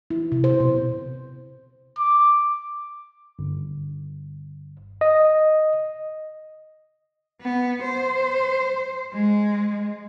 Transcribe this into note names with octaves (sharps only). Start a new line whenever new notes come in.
E4
C3
C5
B2
D6
G1
D#5
B3
C5
G#3